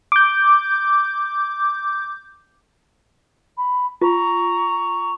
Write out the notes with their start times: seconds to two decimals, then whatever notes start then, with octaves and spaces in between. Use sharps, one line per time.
0.12 D6 G6
3.57 B5
4.02 F4 A#5 C#6